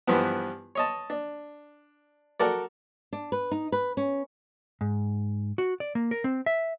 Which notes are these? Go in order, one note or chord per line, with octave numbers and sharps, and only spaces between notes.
G2 E3 F3 B3
C#5 D#5 A5
D4
F#4 A4 A#4 D5
D4
B4
D#4
B4
C#4
G#2
F#4
D5
A#3
A#4
C4
E5